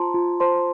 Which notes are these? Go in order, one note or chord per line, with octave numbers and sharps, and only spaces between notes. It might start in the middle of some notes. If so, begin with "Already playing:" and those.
Already playing: F4 C5 A5 A#5 C6
F4
C5 A5 C6